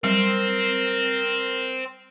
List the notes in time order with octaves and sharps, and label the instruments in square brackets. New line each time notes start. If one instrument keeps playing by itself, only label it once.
[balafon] F#3 G3 [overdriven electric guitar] C4 [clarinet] A#4